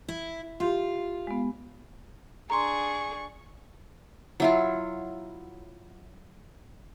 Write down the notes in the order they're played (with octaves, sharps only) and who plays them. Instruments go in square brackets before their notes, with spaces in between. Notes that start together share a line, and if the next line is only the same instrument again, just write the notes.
[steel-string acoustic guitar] E4
[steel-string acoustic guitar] F4 [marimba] G4 F5 C6
[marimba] G#3 B3
[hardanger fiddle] D4 G#4 [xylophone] A#5 C6 [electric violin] C#6
[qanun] F#3 E4 F4